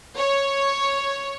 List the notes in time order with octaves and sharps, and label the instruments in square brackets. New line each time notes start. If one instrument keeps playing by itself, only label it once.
[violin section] C#5